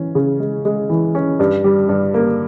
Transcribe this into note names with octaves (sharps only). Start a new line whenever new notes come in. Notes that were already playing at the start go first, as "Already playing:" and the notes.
Already playing: E3 C#4
C#3
G#3
G#3
E3
C#4
G2
G3
G2
A#3